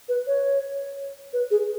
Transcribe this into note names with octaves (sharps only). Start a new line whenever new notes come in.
B4
C#5
B4
G#4